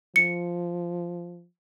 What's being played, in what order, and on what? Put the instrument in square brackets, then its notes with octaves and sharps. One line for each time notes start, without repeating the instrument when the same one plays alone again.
[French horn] F3 [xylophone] C#7